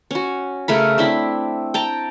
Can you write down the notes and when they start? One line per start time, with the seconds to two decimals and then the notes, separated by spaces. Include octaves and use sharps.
0.11 C#4 F#4
0.68 C#3 A3 A#4 B5
0.98 C4 D4 E4 B5
1.74 G5 A5 A#5